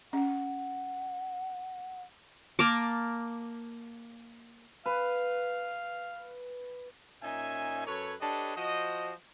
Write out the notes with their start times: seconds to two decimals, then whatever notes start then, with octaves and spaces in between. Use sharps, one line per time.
0.13 C#4 F#5
2.59 A#3 A5 D6
4.86 B4 F5
7.23 A#2 C#4 D#4 E5 G#5
7.87 F#2 A4 B4 C#5
8.21 D4 G4 A4 B4 C#5 D#5
8.57 F3 F#4 C5 D#5